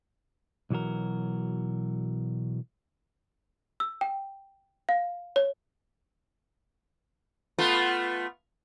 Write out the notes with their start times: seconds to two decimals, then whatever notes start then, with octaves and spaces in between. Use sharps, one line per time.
0.70 B1 E3 F#3 F#4 A#4
3.80 E6
4.01 G5
4.89 F5
5.36 C#5
7.58 A3 B3 F4